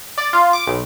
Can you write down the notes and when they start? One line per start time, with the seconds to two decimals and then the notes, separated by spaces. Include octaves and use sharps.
0.18 D5
0.33 F4
0.53 D6
0.67 B1